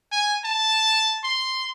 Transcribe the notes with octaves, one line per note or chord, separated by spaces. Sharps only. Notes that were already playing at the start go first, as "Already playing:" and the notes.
G#5
A5
C6